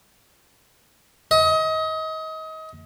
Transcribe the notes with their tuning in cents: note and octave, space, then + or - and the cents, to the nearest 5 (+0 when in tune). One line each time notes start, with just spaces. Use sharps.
D#5 +30